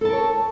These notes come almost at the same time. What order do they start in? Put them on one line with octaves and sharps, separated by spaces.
A4 A5 A#4 C#5